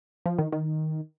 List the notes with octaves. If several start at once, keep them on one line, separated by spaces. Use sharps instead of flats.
F3
D#3
D#3